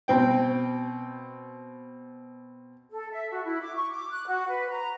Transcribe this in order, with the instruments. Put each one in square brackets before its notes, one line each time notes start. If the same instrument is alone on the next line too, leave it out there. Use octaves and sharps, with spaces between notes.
[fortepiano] B2 C4 G5
[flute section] A4
E5
F#4
E4
D6
C#6
D6
F#6
F#4
B4
A#5